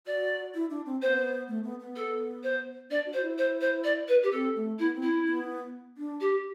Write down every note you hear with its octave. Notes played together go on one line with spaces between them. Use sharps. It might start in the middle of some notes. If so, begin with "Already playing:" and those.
F#4 D5
E4
D4
C4
B3 C4 C5
A3
B3
B3
A4
C5
D4 D5
F#4
C5
E4
C5
C5
D5
B4
G4
C4 A4
A3
B3 E4
C4
E4
C4
B3
D4
G4